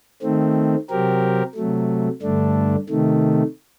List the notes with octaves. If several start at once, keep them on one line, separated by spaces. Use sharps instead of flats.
D#3 A3 C4
C3 F#3 C4 G4 A#4
C3 F#3 A3
G2 D3 A3 D4
C3 D#3 A3